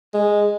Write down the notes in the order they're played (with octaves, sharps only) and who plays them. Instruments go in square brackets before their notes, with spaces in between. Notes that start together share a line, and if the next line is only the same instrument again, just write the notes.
[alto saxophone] G#3